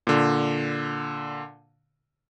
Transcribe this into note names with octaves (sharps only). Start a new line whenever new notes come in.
A#2 D3